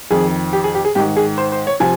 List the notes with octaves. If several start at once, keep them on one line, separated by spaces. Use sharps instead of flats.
F2 D#3 G#4
G4
G#4
G4
G#4
G#2 D#3 G4
G#4
C5
C5
C#5
C3 F3 G#5